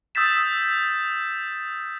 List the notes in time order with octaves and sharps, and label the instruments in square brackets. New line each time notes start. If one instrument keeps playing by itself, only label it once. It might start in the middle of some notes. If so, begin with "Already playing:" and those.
[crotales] D#6 E6 G6 A6 B6 E7